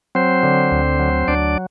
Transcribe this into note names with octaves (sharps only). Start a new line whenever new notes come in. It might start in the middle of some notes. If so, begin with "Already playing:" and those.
F#3 C4 C5
D3
D2
F#3
D2 D4 D5